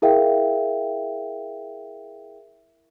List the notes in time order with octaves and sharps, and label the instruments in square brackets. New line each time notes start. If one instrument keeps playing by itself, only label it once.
[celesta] E4 G#4 A#4 E5 F5 G5